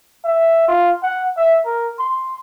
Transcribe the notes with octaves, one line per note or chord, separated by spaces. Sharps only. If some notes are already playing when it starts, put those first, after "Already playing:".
E5
F4
F#5
E5
A#4
C6